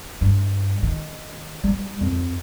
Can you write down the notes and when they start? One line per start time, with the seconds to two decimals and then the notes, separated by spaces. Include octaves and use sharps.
0.21 G2
0.83 D#3
1.64 G3
2.01 F2